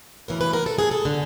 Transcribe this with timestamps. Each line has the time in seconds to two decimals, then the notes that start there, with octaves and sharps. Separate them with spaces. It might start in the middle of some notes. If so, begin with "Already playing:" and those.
0.28 D2 C#3 E3 A#4
0.41 B4
0.53 A#4
0.66 A4
0.78 G#4
0.91 A4
1.05 D3